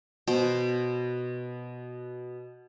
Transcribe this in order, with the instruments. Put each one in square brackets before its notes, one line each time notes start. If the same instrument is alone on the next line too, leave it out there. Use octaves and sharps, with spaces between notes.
[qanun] B2 C5